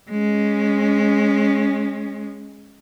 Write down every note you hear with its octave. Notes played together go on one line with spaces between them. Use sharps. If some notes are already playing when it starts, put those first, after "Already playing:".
G#3 C#4